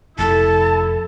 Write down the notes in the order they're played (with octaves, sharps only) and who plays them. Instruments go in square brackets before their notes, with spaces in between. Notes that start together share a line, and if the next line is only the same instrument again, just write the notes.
[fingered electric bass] F1 [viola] E4 A4 [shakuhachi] A5